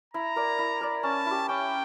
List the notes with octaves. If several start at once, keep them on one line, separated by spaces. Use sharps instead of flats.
E4 A#5
A#4 D5
E4
A#4 D5
C#4 A5
E4
G4
C#4 G5